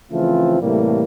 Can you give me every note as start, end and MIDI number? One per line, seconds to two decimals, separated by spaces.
0.12 0.59 49
0.12 0.59 52
0.12 0.59 53
0.12 0.59 57
0.12 0.59 60
0.12 0.59 65
0.60 1.04 45
0.60 1.04 48
0.60 1.04 52
0.60 1.04 55
0.60 1.04 57
0.60 1.04 58